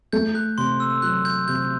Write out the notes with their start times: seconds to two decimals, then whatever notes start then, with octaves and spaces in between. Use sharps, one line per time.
0.13 A3 G6
0.35 F#6
0.58 C3 C6
0.80 E6
1.02 F#3 F#6
1.25 G6
1.48 C3 G6